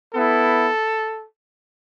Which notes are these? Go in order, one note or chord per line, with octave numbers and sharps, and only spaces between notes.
B3 E4 A4